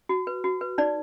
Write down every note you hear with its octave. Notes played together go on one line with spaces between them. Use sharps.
F#4
B4
F#4
B4
D#4 D5